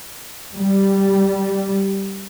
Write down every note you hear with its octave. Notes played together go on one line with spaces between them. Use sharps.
G3